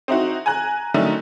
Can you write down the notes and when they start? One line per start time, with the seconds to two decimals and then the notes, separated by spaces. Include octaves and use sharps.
0.08 C4 D#4 E4 F#4
0.46 G#5 A#5 F#6
0.94 D3 D#3 F#3 A3 C#4 D#4